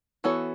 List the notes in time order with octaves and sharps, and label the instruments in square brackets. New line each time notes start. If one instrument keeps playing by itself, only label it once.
[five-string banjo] E3 B3 F#4 A4 C#5